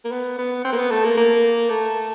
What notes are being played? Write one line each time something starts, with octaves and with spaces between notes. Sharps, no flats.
A#3
B3
B3
C4
A#3
B3
A3
A#3
A#3
A3